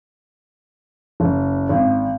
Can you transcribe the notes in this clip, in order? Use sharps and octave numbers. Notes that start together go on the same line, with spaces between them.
F#1
G#1